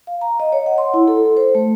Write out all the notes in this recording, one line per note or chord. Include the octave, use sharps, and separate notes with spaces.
F5
A#5
D#5
C#5
F#5
C6
E4
A4
C5
A3